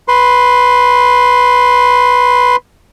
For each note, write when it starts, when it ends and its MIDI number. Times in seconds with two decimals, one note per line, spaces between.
0.08 2.56 71
0.08 2.56 84